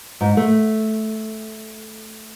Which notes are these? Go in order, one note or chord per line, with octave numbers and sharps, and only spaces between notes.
G#2
A3